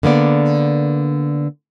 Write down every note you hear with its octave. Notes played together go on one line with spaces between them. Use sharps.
D3 A#3 B3 D5